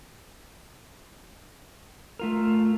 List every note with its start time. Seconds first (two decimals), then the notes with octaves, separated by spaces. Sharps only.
2.19 A3 F4 A#4